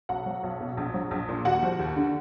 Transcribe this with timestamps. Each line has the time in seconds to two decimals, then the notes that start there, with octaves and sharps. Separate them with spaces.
0.09 B1 F#4 F#5
0.26 F#3
0.43 B1
0.60 B2
0.77 A#1
0.94 F#3
1.11 A#1
1.28 A#2
1.45 D#2 F#4 F#5
1.62 F3
1.79 D#2
1.96 D3